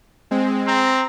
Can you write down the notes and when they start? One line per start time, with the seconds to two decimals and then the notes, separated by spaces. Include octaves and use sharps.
0.31 G#3 C4
0.67 C4 A#5